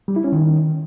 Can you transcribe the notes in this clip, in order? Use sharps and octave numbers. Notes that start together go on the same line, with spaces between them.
G3
E4
C#4
D#3